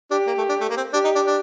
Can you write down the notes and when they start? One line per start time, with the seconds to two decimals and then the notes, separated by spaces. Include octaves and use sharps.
0.10 D4 G4
0.27 A#3
0.38 A3
0.49 D4
0.61 A3
0.69 A#3
0.77 C4
0.93 D4 G4
1.05 D#4
1.15 D4
1.27 D4